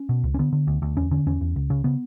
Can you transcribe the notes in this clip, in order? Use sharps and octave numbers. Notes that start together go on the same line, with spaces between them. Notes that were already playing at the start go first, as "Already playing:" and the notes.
Already playing: C#4
B2
C#2
C#4
D3 B3
D3
D2
D2
E2 C#4
D3 C#4
E2 C#4
E2
C#2
C#3
C#3 B3